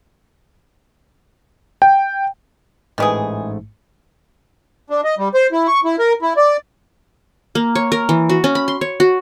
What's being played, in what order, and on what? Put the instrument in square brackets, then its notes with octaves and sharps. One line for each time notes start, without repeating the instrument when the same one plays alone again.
[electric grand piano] G5
[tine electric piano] A1 G#2 A3 [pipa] D#3 E3 G#4
[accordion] D4
D#5
G3
C5
E4
C#6
E4
A#4
E4
D5
[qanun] A#3
C#5
A#4
E3
F#4
C#4
B5
C6
C#5
F#4